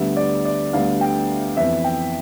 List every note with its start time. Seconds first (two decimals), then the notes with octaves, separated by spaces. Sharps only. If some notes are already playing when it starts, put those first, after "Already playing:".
Already playing: D2 D3 G3 B3 E5
0.17 D5
0.45 D5
0.73 D2 D3 G3 B3 F5
1.01 G5
1.57 F2 E3 B3 E5
1.84 G5